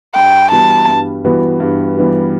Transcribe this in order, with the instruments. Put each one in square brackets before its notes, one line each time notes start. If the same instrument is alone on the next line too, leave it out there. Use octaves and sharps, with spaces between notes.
[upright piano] G2 [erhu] G5
[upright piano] E3 G3 B3 F#4 [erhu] A5
[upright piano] G2
E3 G3 B3 F#4
G2
E3 G3 B3 F#4